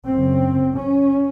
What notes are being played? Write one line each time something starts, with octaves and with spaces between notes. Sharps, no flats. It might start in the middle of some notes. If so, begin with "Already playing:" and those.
F#1 F#2 C#3 C4
C#4